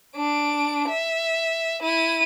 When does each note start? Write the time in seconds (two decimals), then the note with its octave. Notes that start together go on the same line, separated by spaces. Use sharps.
0.16 D4 D7
0.89 E5
1.83 E4 D#7